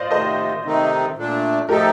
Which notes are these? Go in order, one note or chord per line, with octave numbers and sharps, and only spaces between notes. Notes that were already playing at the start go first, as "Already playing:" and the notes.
Already playing: C5 D5 D#5 F5
C3 D#3 A3 C5 D#5
C3 D#3 A3 C4 D#4
A#2 A3 D4
F3 A3 D#4 G4 A4 A#4